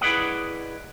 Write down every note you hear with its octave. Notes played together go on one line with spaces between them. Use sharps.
E4 G#4 B4 D5 D#5 F#5